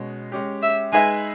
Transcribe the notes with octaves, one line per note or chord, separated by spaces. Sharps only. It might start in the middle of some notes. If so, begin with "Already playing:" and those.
Already playing: B2 G#3 C#4
G#3 C#4 G4
E5
G#3 D#4 G#4 B4 E5 G#5